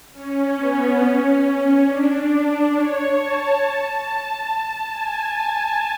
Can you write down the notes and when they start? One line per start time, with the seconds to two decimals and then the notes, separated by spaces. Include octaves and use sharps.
0.13 C#4
0.57 B3
1.00 C#4
1.86 D4
2.73 C#5
3.16 A5
3.59 A5
4.89 G#5